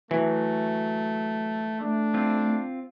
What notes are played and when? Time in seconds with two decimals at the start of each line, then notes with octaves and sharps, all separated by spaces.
0.11 E3 F#3 A3
1.81 A3 D4
2.14 C4 F4